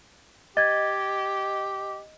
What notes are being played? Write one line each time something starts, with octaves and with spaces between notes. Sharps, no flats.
G4 D#5 G#6 A6